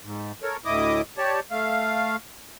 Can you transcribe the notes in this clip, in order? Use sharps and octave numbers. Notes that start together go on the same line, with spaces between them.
G#2
A4 A#4 C#5
D2 A2 E4 D#5 D6 D#6
G4 C#5 D5 A5
A3 F5